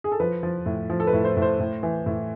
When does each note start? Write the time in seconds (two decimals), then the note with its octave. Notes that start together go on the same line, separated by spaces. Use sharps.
0.04 G#4
0.12 A4
0.20 F3 B4
0.43 F3
0.66 A2
0.90 F3
1.00 A4
1.07 B4
1.13 A2
1.25 C5
1.36 A2
1.42 C5
1.60 A2
1.83 E3
2.06 A2